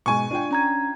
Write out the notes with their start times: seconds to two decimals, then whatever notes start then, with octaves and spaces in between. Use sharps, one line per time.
0.06 G#2 B2 G#5 C#6
0.31 D4 F4 G5
0.51 C#4 A#5 G#6